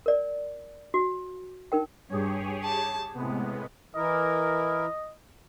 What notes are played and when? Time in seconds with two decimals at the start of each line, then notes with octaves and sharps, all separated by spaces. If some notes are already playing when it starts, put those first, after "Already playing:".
0.06 A#4 D5
0.94 F#4
1.72 D#4 A#4 G5
2.10 G2 G4 G#4 C#5
2.64 A5
3.14 A2 C3 G#3 B3
3.95 E3 E4 A#4 D#5